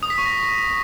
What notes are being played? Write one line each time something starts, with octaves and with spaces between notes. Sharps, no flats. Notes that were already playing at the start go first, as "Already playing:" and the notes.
D#6
B6
C#6
A#6